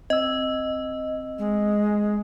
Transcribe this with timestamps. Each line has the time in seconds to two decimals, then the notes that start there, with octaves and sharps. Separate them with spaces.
0.10 C4 D#5 E6
1.38 G#3